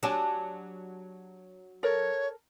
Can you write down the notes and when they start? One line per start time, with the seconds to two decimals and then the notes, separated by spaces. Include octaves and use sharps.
0.03 F#3 D4 G4 G#5 A5
1.83 A4 A#4 C#5